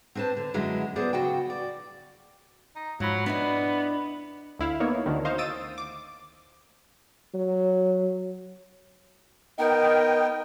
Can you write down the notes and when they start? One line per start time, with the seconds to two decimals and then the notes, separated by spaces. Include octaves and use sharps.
0.15 C4 D4 B4 C5 A5
0.37 D3
0.54 F#2 D3 F#3 G#3 C#4 E4
0.96 F#3 B3 G#4 C5 D5
1.13 C#3 F#4 F#5 G5
1.50 D5
2.75 D#4
3.00 G#2 F3 F#3 B5
3.26 B3 D4 E4 D#5 B5
4.59 D2 E4 F5
4.80 A#3 B3 D#4 C#5
5.06 D2 D3 D#3
5.25 C5 D#5 F5 C#6
5.38 D#6 E6 A6 D7 D#7
5.78 D6
7.34 F#3
9.59 B3 D#4 A#4 D#5 G5